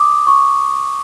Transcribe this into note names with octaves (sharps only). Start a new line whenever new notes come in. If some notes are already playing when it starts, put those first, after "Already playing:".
Already playing: D6 D#6
C#6